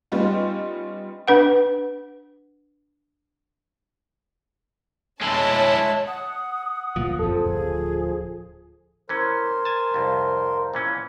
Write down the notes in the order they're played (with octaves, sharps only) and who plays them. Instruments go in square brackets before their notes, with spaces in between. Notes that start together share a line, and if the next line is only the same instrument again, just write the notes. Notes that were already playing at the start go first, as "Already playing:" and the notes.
[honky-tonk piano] G3 B3 C#4 D#4 F4
[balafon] D4 B4 F#5
[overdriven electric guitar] G#3 E4 [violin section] C#5 A5
[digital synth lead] F#5 [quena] D#6
[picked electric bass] D2 A#2 F3
[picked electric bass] F#1 F2 [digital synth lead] F3 [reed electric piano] A4
[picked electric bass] D1 [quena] G#4
[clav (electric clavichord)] E3 C#4 [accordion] A#4 C5
[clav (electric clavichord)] G#5 A5
C2 F2
A#2 E3 C#4